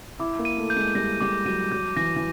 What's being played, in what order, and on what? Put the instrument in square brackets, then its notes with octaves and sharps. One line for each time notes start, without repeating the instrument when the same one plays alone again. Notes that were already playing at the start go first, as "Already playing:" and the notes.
[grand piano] E4 [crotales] D6
[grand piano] A#3
[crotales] D#7
[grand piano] A3
[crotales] G6
[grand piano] G#3
[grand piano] G3 [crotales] A#6
[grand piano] G3 [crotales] D6
[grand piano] F#3 [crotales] D#7
[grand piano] F#3 [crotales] G6
[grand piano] E3 [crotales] A#6
[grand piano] E3